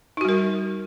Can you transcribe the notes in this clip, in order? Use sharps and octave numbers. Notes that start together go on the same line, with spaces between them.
G3 D#4 F#4 A#4